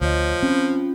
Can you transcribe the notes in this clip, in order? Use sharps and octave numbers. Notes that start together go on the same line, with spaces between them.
D2 F3 C#5 D#5
C4 C#4 F4